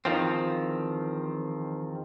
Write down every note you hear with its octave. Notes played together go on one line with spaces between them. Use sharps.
E2 D#3 F3 C4